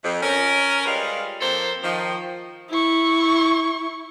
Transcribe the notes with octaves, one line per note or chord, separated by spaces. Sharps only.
F2
C#4 A#4
G3 G#3 F4 B4 F5
F2 F3 A#3 A4 C5
D#3 F3
E4 C#6